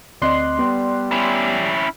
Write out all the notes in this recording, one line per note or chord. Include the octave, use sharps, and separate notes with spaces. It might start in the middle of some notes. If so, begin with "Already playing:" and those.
D2 C4 D5 D#5 C6 F#6
G3 B3
C#4 E4